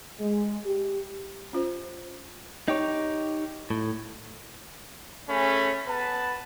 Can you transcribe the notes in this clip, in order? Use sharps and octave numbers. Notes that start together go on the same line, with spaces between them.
G#3
G4
C#4 F4 C5
D#4 G4 C#5
A2
A3 C#4 G#4 B5
B3 B4 A5